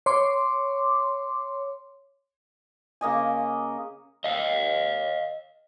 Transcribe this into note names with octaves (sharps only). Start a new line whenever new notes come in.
C#5 C6 D6
C#3 A#3 D#5 G#5
D#5 F5